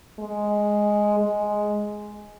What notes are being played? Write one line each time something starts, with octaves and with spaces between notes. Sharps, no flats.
G#3
G#3